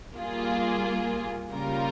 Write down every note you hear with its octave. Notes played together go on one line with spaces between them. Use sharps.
G3 A#3 F4 G#4
C#3 G3 A#3 F4 A#4